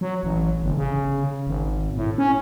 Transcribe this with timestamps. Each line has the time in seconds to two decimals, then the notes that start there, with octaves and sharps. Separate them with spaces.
0.01 F#3
0.23 A1
0.62 G1
0.77 C#3
1.47 G#1
1.96 A2
2.18 C#4